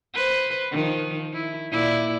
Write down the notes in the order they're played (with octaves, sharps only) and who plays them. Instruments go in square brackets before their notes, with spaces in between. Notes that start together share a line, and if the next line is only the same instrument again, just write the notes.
[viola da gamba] B4 C5
D#3 F3
E4
A#2 E4 D5